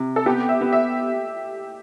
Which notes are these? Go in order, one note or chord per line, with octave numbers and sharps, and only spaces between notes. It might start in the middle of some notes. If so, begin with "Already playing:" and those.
Already playing: C3
A4
B3 G4
E5
B3
E5